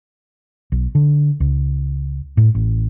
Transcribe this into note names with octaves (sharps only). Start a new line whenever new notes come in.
B1
D3
C#2
A2
A1